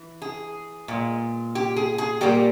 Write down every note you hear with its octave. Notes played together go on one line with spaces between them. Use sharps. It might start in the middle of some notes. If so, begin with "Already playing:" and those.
Already playing: E3
G#4
A#2 G#3
G4
G#4
G#4
A#2 G3 A#3 G4